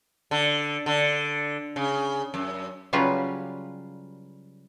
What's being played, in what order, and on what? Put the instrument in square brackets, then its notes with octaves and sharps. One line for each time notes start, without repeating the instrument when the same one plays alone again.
[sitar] D3
D3
C#3
F#2
[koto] C#3 F#3 G3 F4 B4